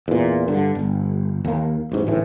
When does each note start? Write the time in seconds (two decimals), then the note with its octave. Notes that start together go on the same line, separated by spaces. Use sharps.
0.08 E2 A#2
0.48 G2 D3
0.75 G1
1.45 D#2 A#3
1.92 A1 G#2
2.07 A1 D2 A2 E3